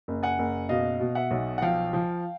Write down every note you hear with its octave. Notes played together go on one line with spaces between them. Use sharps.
F#1
F#5 G#5
F#1
B2 D#5 F5
B2
E5 F#5
B1
F#5
F3 F5 G5
F3